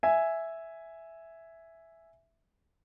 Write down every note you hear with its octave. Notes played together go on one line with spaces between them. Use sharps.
E5 G#5